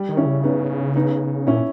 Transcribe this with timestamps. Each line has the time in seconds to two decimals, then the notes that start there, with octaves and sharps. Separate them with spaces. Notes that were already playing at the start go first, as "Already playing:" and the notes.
Already playing: G3
0.09 D#3
0.17 C#4 E4
0.26 C#3
0.43 B3 D#4
0.96 B3 D#4
1.47 A#2 C#4 E4